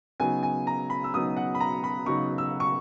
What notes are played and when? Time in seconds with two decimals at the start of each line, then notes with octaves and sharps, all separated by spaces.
0.20 C#3 F#3 B3 D#4 G#5
0.43 G#5
0.67 A#5
0.90 B5
1.04 E6
1.13 C#3 F#3 B3 D#4 D#6
1.37 F#5
1.55 B5
1.60 A#5
1.84 B5
2.06 C#3 F#3 B3 D#4 C#6
2.38 E6
2.60 C#6